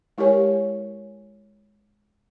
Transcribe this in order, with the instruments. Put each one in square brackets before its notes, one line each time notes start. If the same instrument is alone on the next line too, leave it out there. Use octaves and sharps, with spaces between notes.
[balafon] G#3 E4 G4 A#4 C#5 G#5